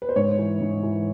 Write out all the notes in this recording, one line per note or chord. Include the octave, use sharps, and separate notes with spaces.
B4
C5
G#2 C#5
E3
G#2
E3